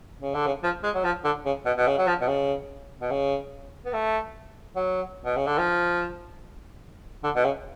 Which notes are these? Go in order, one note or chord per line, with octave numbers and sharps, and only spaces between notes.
C#3
D3
C#3
F3
G#3
F#3
F3
D3
C#3
B2
B2
C#3
F#3
F3
B2
C#3
B2
C#3
B3
A3
F#3
B2
C#3
D3
F3
D3
B2
C#3